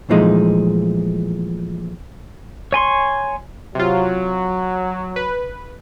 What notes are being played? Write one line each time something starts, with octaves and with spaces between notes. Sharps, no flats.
A#2 E3 F3 G#3 A3 D#4
C#5 G#5 C6 C#6
C3 F#3 F4
B4